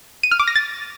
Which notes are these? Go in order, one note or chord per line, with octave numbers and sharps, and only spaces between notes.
D#7
F6
D6
A#6
A6